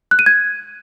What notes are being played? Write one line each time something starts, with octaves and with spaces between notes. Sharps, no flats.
F#6
D#7
G#6